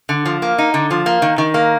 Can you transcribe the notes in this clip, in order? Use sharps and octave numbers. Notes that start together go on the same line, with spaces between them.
D3
F3
A#3
D#4
D3
F3
A#3
D#3
D#3
A#3